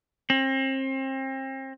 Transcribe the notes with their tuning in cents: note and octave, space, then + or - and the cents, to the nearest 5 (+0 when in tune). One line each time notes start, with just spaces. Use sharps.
C4 +35